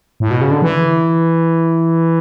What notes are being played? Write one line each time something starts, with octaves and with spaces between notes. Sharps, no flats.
A2
B2
C#3
D3
E3